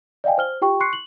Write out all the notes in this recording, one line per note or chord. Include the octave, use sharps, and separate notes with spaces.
D5 D#5 F5 G5 G#5
C5 F6 G7
F4 G4 G5 C#6
C6 C#6 F#6 C7 C#7
F#7